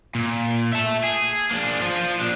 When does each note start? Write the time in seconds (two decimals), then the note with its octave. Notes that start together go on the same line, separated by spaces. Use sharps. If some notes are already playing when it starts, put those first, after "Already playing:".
0.15 A#2
0.73 E5 A5
1.04 G#4
1.52 A#3 D4
1.81 F3 F4
2.20 A#2 D4